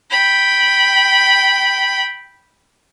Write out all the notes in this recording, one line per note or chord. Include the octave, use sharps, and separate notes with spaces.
G5 B5